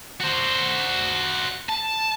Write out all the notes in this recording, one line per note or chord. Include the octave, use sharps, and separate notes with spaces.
F#4 C5
A5